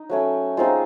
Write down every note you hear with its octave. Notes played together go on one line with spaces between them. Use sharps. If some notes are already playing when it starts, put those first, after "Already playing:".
Already playing: D#4
F#3 A3 C#4 F#4
G#3 C4 D#4 F4